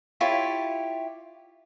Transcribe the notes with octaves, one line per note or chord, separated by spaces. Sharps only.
E4 F4 G4 C#5